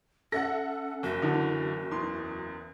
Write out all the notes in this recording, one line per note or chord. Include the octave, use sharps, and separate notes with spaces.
C#4 A4 E5 F#5 A#6
F#1 F#4
D3 E3
E2 C6